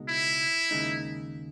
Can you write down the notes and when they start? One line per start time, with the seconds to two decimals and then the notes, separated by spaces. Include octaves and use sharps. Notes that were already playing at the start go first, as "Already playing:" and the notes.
Already playing: C#2 B2 G#3 D#4
0.09 E4
0.71 D#2 C#3 G#3 D#4